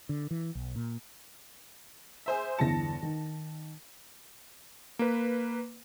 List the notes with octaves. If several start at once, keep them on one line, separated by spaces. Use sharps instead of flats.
D3
E3
B1
A#2
G#4 C5 E5
G1 E2 A5 A#6 C#7
D#3
A#3 B4